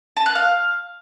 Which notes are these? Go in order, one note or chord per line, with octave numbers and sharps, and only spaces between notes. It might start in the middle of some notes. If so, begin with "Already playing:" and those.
A5
F#6
F5